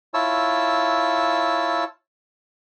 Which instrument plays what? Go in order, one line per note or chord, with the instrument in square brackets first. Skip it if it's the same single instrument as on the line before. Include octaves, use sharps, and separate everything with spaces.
[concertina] E4 F4 C#5 A5 E6